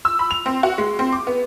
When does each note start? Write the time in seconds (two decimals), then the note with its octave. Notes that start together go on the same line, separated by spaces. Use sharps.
0.05 E6
0.19 B5
0.31 F7
0.46 C4
0.63 F#4
0.78 G#3
0.99 C4
1.13 D6
1.27 B3